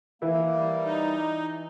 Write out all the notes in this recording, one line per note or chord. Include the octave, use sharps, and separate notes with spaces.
E3 A#3 E4
G3
D#4